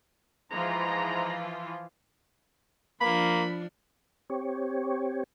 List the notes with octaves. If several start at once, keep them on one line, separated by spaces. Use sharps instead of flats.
G#2 E3 F3 F4 A#5
F3 A#3 D4 B5
C4 G4 C#5